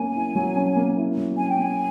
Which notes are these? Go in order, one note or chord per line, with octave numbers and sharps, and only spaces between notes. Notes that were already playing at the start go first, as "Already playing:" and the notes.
Already playing: F#3 A#3 C#4 G#5
E4
F#3
C#4
A#3
E4
F#3
C#4 G#5
G5
A#3 G#5